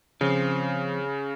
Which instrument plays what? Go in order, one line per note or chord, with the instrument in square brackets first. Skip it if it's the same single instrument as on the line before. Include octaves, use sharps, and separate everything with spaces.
[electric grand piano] C#3 [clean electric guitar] F3 C4